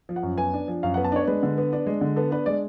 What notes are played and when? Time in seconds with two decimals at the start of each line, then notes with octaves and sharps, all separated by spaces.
0.09 F3
0.16 F#5
0.23 F#2
0.38 B3 G#5
0.54 D4
0.68 F3
0.83 F#2 F5
0.94 F#5
0.97 B3
1.04 A5
1.12 D4 C#5
1.27 G#3 B4
1.43 D3
1.58 B3
1.73 D4
1.87 G#3
2.01 D3
2.16 B3 A4
2.31 D4 B4
2.46 G#3 D5